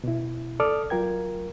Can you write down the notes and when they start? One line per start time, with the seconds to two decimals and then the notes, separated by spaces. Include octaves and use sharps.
0.04 B2 E4
0.60 A4 D5 D6 D#6 F6
0.90 F#3 F4 A#4 G5 G#6